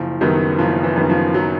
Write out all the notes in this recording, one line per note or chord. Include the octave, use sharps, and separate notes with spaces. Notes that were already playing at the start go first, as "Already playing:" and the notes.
Already playing: F#1 F3
F#2 D#3 F#3 G3 B3
F#1 F3
E3
F#2 D#3 G3 B3
F3
F#3